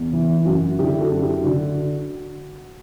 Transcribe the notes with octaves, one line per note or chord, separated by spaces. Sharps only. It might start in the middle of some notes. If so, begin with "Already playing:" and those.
Already playing: E2
E3
E4
F#2 F#4
D3 E4 G4
G4
F#4 A4
F#2
E4 G4
D3 F#4